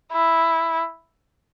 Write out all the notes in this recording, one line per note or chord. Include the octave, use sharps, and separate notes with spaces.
E4